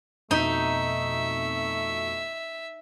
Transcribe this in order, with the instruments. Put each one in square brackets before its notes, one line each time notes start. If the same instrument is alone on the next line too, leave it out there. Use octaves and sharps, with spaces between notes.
[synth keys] F2 B2 [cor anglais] A3 [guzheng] D#4 [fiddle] E5